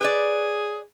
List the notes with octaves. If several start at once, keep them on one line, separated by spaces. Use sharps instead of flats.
G#4 B4 C#5 D5